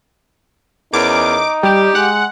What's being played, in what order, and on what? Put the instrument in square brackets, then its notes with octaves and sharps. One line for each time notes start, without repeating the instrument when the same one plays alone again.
[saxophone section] E2 C#4 A#4 [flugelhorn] D#4 [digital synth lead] D6
[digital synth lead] G3 [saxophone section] G4
[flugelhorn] G#3 [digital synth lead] F#5